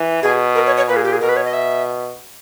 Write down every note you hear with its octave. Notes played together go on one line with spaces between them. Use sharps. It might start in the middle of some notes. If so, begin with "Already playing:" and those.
Already playing: E3
B2 G#4
A#4
C#5
C#5
A#2 B4
G#4
G4
G#4
B2 A#4
B4
C#5
D#5
E5